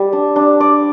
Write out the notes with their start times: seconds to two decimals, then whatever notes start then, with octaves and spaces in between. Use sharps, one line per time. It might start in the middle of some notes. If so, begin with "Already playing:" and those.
Already playing: G3
0.13 D4
0.36 D4
0.60 D5